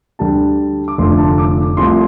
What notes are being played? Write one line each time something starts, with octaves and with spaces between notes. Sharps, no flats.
D2 D3 G3 A5
D6
F1 F2 D3 F3 A3 C6
A5
D6
D6
C2 C3 F3 A3 C6